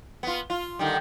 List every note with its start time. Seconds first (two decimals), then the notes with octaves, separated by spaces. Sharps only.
0.23 B3 F4
0.50 F4
0.79 D3 D#3 G3